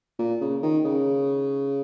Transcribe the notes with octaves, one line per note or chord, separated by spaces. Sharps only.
A#2
C#3
D#3
C#3